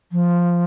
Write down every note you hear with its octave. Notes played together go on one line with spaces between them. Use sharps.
F3